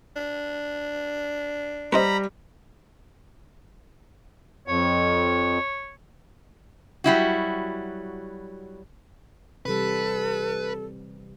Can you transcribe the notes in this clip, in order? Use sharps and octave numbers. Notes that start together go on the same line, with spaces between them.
D4
G3 B4 C5 D#5 A#5 B5
F2 C#5
F#3 G3 E4 F#4
C3 E3 G3 A4 B4